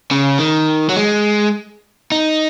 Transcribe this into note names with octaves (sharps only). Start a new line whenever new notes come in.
C#3
D#3
F#3
G#3
D#4